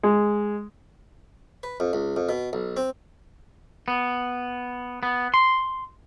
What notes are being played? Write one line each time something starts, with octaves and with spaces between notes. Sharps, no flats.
G#3
B4
F2
C#2
F2
B2
B1
C4
B3
B3
C6